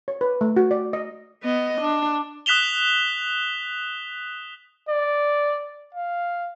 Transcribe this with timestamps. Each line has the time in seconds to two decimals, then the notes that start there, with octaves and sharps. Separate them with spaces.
0.08 C#5
0.21 B4
0.41 A3
0.56 F#4
0.71 D5
0.93 D#5
1.43 B3 D#5
1.81 D4
2.46 D#6 F#6 B6 E7 F7 G7
4.89 D5
5.95 F5